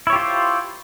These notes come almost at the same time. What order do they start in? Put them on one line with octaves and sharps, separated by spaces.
E4 C#5 G4 F4 C5